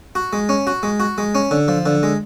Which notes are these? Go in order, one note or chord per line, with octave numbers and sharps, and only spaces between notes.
F#4
G#3
C#4
F#4
G#3
F#4
G#3
C#4
D3
F3
D3
G#3